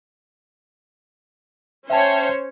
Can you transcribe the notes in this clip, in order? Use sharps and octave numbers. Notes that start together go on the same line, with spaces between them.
C#4 C5 C#5 E5 G5 A5